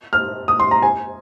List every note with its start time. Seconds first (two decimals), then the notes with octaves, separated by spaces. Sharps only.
0.13 F6
0.48 D#6
0.60 C6
0.71 A#5
0.82 G#5